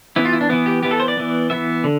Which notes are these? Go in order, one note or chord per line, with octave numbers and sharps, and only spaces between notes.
E3 B3 E4
F4
E4
D4
E3 B3 E4
G4
E3 B3 G4
A4
C5
D5
E3 B3
E3 B3 E5
D3